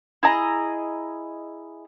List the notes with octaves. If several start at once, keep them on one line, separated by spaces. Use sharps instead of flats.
E4 G#4 D#5 A#5